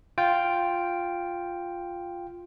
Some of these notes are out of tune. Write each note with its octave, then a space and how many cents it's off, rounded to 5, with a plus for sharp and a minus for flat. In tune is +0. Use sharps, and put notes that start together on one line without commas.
F4 +0 G5 +0